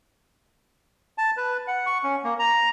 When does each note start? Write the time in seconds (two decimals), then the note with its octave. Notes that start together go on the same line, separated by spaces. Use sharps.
1.18 A5
1.37 B4
1.67 F#5
1.86 C#6
2.03 C#4
2.24 A#3
2.39 A#5